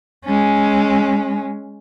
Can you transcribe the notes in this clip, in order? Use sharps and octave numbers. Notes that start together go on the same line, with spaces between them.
G#3 C#4